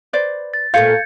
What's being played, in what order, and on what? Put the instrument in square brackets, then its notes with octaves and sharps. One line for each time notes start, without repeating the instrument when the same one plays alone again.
[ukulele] B4 C5 D5
[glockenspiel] A6
[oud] A#2 A3 F4 [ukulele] F5 [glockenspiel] G6 G#6 C#7